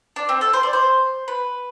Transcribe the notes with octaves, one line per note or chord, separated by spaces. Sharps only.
D4
C4
A4
C5
D5
C5
B4